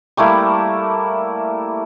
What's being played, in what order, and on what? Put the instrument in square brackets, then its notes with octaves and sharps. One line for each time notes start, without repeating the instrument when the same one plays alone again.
[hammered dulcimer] G3 A3 A#3 E4